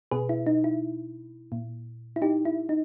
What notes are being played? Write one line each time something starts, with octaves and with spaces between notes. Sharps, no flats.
B2 G#4 B4
E4
D#4
E4
A#2
E4
D#4 G4
E4
D#4